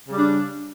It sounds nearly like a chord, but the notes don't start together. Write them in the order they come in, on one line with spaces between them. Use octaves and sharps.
C#3 G3 D4